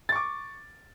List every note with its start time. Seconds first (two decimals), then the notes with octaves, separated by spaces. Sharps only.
0.09 A6
0.12 C#6
0.16 D6